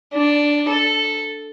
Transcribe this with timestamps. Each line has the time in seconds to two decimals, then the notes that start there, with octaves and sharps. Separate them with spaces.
0.13 D4
0.68 A4